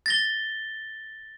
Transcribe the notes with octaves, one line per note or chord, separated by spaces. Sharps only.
A6 A#6 G7